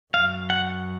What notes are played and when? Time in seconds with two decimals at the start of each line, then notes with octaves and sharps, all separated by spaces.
0.13 F#2 F5
0.50 F#5